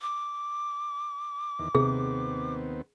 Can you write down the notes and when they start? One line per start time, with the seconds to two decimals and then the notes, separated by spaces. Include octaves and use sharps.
0.02 D6
1.59 E2 D#3
1.75 D#2 C3 B3 C4 G#4